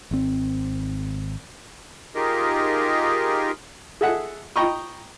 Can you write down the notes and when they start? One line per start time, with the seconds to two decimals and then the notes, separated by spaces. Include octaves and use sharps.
0.11 G#1 C4
2.15 D#4 F4 G4 G#4 A#4 D#5
4.01 G#4 A4 D#5 E5 F#5
4.56 D#5 G5 A#5 B5 C#6 D#6